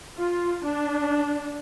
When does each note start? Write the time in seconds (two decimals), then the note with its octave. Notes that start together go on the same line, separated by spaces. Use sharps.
0.17 F4
0.64 D4